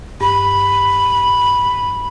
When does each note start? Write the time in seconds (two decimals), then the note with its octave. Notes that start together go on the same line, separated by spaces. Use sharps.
0.21 G2 B5